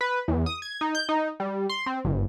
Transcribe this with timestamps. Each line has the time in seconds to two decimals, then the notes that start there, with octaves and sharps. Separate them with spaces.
0.01 B4
0.28 E2
0.46 D#6
0.62 G#6
0.81 D#4
0.95 G6
1.09 D#4
1.40 G3
1.69 C6
1.86 C4
2.05 G1